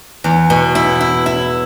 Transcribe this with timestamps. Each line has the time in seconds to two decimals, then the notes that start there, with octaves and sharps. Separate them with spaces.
0.24 E2
0.50 B2
0.75 E4
1.01 E4
1.26 E4